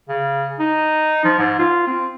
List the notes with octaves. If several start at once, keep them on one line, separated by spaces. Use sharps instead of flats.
C#3
D#4
F3
G#2
F4
C4